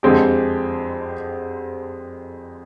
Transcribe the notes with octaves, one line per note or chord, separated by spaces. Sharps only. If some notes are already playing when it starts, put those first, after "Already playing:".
F2 D3 G#3 C4 G4